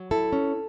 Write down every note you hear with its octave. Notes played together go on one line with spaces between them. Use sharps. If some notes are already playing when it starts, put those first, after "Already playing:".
Already playing: F#3
E4 A4
C#4